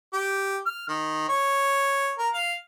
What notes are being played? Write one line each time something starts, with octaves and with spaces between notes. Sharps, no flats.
G4
F6
D#3
C#5
A#4
F5